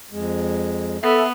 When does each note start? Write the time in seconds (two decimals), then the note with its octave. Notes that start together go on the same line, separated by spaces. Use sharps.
0.12 F2 G#3
1.02 B3 A4 E5